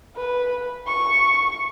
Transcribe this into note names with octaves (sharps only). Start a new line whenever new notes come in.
B4
C#6